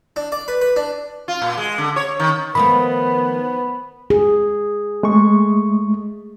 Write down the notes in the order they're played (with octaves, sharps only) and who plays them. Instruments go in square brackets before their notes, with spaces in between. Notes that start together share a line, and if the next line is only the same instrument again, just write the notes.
[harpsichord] D4
D5
B4
B4
D4
[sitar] F4
A#2
G#3
D3
C#5
D#3
[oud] D#3 F3 A3 [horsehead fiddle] B3 [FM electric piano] B5
[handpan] G#4
[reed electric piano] G#3 A3 C#6